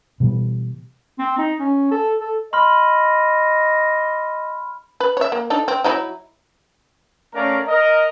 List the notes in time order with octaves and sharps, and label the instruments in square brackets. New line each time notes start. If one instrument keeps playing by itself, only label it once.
[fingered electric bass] B2 E3 G3
[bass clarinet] C4
D#4
C#4
A4
A4
[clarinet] D#5 [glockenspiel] B5 C6 F6
[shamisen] B4
C#5 E5
A#3
D4 D#4 A4
C4
F#3 D#4 E4
[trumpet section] A3 C#4 A#4 D5 F5 A#5
A#4 D#5